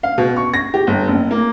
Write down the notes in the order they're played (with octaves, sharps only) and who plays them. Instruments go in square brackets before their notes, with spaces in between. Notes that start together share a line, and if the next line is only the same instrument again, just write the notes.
[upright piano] F5
B2
C#6
A#6
G4
G1
F#1
A#3